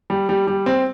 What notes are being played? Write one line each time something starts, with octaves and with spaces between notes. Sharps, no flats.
G3
G3
G3
C4